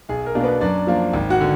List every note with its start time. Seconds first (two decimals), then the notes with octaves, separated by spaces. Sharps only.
0.09 B1 G#4
0.26 A#4
0.35 B2 A#3 D4
0.44 B3 B4
0.61 F#2 D4 D5
0.87 F3 A#3 D4
1.13 G#1
1.30 F#4 F#5
1.40 D3